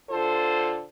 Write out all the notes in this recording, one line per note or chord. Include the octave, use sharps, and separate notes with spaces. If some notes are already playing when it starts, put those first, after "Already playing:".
D3 F4 A4 C5